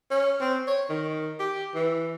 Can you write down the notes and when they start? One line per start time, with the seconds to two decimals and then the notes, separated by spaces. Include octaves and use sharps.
0.11 C#4
0.41 C4
0.67 C#5
0.90 D#3
1.40 G4
1.75 E3